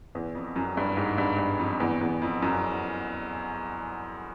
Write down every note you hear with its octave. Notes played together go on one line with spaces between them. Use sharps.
E2
F2
F#2
G2
G#2
G2
G2
F2
E2
E2
F2
F#2